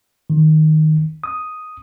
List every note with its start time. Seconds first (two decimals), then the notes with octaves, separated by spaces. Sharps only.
0.30 D#3
1.24 D#6